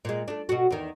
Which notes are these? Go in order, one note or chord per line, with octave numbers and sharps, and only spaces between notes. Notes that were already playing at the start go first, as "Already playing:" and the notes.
A#2 G#3
A3 D4
B2 F#4
E2 D#3